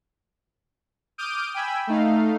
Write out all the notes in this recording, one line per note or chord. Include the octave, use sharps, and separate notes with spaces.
D6 D#6 F6 G6 D7 D#7
G5 G#5 B5 E6
A3 D#4 F5